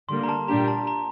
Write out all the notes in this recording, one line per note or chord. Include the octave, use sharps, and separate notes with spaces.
D3 G3 A#3 C6
A#5
A5
A#2 G3 A#3 D4 G4 A#5
A5
A#5